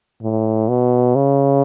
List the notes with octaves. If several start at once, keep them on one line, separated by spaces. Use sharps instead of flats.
A2
B2
C#3